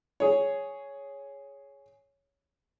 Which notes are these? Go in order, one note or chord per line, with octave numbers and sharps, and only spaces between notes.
G#4 C#5